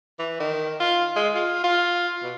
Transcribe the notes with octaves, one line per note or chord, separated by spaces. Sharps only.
E3
D#3
F4
G#3
F4
F4
B2